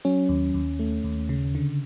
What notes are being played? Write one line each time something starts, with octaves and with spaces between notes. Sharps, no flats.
F#3 C#4
D#2
D#2
A3
D#2
C#3
D3